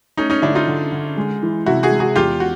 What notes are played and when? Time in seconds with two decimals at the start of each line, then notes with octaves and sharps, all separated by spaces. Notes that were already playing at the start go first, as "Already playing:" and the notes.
0.17 A3 C#4 D#4
0.30 C#4 D#4
0.42 D3 D4 E4
0.55 D#4 F4
0.68 D3
0.92 D3
1.17 G#3
1.42 E3
1.66 C3 E4 F#4
1.83 F#4 G#4
1.91 G#3
2.00 F#4 G#4
2.16 E2 F4 G4
2.40 F#4